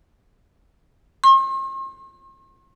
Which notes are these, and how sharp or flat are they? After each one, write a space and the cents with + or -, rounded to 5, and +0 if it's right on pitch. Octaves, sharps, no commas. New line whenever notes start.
C6 +45